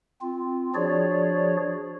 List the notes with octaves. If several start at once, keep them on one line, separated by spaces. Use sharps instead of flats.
C4 F4
F3 D4 F#4 G#4 C#5 D5